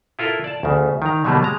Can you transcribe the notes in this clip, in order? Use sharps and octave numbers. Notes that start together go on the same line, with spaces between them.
E4 F4 A4 A#4
D5 A5
D2 C#3
D#3 A#5
B2 D3 F#3 G3 A3 A#3
G#3 A#5